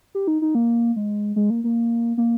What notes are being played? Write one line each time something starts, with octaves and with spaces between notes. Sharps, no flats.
G4
D#4
D#4
A#3
G#3
G#3
A#3
A#3
A#3